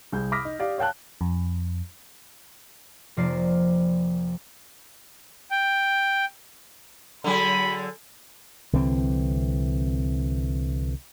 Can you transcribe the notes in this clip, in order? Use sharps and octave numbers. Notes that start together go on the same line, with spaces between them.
C2 G#4 G6
B5 D6 D#6 F6 A#6 B6
D#4
G4 D5 F5
C#5 F5 G5 A5 F#6
F2
F1 F3 A#3 D5 C7
G5
D3 F#3 G#4 B5
C2 D3 E3 C4